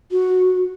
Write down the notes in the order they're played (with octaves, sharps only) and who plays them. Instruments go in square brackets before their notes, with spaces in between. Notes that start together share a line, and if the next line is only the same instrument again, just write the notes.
[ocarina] F#4